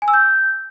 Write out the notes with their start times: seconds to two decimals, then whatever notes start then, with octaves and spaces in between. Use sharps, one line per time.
0.02 G#5
0.08 E6
0.13 G6